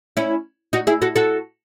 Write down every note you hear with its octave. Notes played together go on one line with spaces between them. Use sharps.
C#4 E4
D#4 F#4
E4 G#4
F#4 A4
F#4 A4